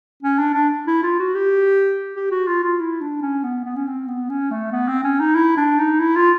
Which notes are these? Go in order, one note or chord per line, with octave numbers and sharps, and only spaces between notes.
C#4
D4
D4
E4
F4
F#4
G4
G4
F#4
F4
F4
E4
D4
C#4
B3
B3
C#4
C4
B3
C#4
A3
B3
C4
C#4
D#4
E4
D4
D#4
E4
F4